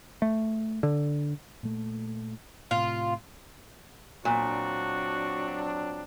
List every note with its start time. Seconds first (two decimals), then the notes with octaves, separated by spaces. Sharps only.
0.22 A3
0.83 D3
1.63 A#2 A3
2.71 A2 C3 F4
4.25 A#2 F#3 C4 D4 F#4